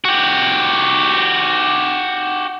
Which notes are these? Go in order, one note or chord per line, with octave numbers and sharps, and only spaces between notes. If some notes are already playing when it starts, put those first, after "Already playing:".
F#4 G4